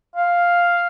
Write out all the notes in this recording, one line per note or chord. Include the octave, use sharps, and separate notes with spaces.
F5